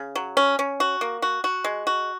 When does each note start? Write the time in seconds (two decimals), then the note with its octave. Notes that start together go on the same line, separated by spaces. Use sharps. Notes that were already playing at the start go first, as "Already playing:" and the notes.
Already playing: C#3
0.16 F#3
0.37 C#4
0.59 C#4
0.80 F#4
1.01 A#3
1.22 F#4
1.44 F#4
1.64 G#3
1.87 F#4